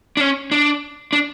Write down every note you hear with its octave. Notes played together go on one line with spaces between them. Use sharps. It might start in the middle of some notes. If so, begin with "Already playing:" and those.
D4
C#4
D4
D4